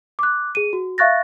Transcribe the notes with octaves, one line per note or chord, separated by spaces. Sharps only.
D6 F#6
G#4 D#7
F#4
E5 F5 C#6 F#6 A6 A#6